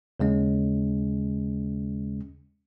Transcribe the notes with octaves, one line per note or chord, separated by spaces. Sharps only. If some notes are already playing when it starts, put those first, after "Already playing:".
D#2 C#3 G#3 C#4